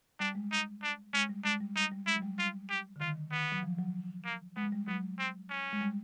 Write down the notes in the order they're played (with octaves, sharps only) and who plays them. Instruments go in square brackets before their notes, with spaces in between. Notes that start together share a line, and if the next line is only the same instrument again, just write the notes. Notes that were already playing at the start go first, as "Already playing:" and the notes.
[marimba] G3 [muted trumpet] D4
[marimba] G#3
[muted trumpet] D#4
D4
[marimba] G#3 [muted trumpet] C#4
[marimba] G3
[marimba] G#3 [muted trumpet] D4
[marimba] G3
[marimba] G3 [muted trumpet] D#4
[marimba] G3
[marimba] G#3 [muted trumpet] E4
[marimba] F#3
G3
[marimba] G3 [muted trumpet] F4
[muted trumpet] G4
[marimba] D3
[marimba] D#3 [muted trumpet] F4
[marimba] D#3 [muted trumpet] B3
[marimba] F#3
F3
F#3
[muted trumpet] A#3
[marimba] G#3 [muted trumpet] B3
[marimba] G#3
G3
[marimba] F#3 [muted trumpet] B3
[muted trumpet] C4
C#4
[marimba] G#3
G3